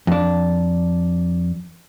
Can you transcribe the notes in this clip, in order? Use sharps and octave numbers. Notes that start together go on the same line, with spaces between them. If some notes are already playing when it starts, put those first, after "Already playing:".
F2 D4